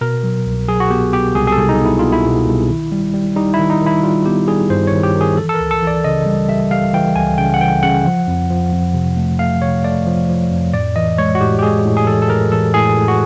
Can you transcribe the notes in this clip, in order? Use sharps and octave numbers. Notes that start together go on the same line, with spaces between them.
B2 A#4
F#3
C2
F#3 G#4
F#4
B3 G4
B3 G4
C2 G#4
G#4
A4
C2
D#4
B3 E4
B3 F4
E4
B2
C2
D#3
G3
G3
G3 D#4
E4
D#3
D#4
D#3
E4
G3 F4
B3 G4
G3 G#4
G2 C5
C#5
D#3
G4
D#3
G#4
E3 A4
A4
A#4
C#2
A4
E3
D5
C#3 D#5
G3
G3 E5
G3 F5
E3 G5
C#2 G#5
C#3 G5
F#5
E3 G5
C#3 F#5
F3
F2
F3
F2
C3
A3
A3 F5
C3 C#5
A3 D5
F3
F3
F2
A2 D5
E3 D#5
G#3 C#5
F#4
A2 G4
G4
G#3 G#4
A2
G#4
E3 A4
A4
A2 A#4
E3 A4
A2 G#4
A2
F#4